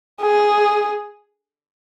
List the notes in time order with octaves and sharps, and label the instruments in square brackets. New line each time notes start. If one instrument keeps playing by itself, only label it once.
[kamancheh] G#4